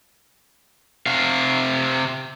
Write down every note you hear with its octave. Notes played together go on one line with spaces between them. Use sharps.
C3 F5